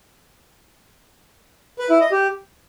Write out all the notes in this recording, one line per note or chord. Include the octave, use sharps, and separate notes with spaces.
B4
E4
D#5
G4